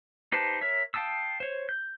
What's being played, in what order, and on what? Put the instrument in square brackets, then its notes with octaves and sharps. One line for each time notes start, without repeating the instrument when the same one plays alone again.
[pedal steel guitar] D#4 G4 B4 C5 A5
A#4 C#5 E5
F5 G5 A5 D#6 E6
C5 C#5
G6